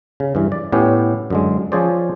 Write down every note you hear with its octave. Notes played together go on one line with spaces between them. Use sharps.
C#3
G2 E3
D5
A2 B3 C#4 G4
F#2 D3 G#3
F3 C#4 G#4 C5 D5